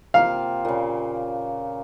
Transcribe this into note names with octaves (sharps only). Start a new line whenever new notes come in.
C3 A#3 F4 F5
A#2 C#3